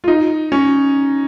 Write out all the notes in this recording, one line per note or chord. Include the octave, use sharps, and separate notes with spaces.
F4
D#4
C#4